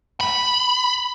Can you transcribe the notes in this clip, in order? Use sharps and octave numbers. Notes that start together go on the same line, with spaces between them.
B5